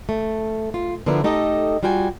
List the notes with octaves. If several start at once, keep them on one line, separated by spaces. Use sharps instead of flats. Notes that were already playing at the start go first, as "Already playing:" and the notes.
A3
F4
D3 F3 B3 D4 E4 A#4
A3 D#4 G4 A4 D#5
G3 F4 F#4 G5 G#5